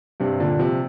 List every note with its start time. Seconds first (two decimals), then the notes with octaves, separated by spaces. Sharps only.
0.20 G2 C3
0.40 A#2 D3
0.59 C3 F3